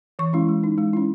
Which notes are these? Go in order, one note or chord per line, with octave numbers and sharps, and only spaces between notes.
E3 C#6
G#3 C#4 E4
G#3
D#4
G#3
C#4 E4